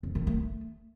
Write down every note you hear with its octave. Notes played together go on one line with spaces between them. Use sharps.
F2
D#3
A3